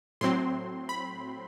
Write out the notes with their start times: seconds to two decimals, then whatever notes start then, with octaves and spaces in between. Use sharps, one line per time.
0.21 A2 F#3 C4 C6
0.89 B5